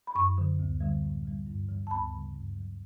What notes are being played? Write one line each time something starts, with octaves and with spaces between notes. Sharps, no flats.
B5
F#2 C#6
D3 F#3
D2
D3 G3
A2
E3 G3
G2
E3 G3
A5
D2 B5
C#3 E3 G3
G2
F#3